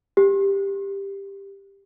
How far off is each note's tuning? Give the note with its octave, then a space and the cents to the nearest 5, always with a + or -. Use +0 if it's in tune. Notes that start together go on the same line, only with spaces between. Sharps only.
G4 +10